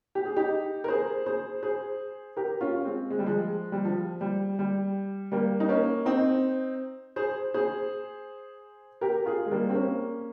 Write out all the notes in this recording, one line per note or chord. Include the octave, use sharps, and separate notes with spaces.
G4
G#4
D#4 G4
A#4
G#4 C5
G#4 C5
G#4 C5
G4 A#4
C#4 F4
G#3 C4
G#3
G3
F3 G#3
G3
F3
G3
G3
G3 A#3
D#4
A#3 C#4
C4 D#4
G#4 C5
G#4 C5
G4 A#4
F4 G#4
G#3
G3 A#3
C4
A#3 C#4